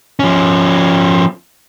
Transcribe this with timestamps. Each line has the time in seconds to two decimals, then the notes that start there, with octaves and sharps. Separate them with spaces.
0.20 F3 C#4